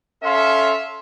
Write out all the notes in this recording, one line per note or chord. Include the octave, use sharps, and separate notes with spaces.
C#4 A4 E5 F5 C6